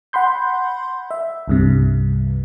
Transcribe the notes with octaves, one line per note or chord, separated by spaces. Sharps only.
F#5 B5 C6 G6
E5
C2 G2 C3